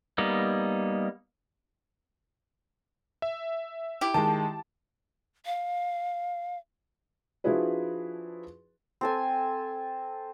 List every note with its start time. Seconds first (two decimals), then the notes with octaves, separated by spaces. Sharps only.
0.18 G3 A#3 B3 D#4
3.22 E5
4.01 E4 G4
4.14 D#3 G#3 A5
5.46 F5
7.44 F3 D4 E4 F#4 G#4 B4
9.01 C4 A4 G#5